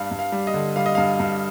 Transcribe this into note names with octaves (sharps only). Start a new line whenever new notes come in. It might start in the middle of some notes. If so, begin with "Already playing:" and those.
Already playing: G2 F5
G2
F5
G3
D#5
D3
G3 F5
D#5
G2 F5
G2